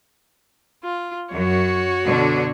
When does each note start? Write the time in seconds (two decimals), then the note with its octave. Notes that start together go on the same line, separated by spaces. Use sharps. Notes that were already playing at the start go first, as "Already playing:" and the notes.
0.84 F4
1.33 F#2 F#4 C#5
2.04 B2 D3 D4